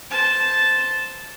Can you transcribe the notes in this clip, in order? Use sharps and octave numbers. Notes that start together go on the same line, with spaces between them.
C5 A5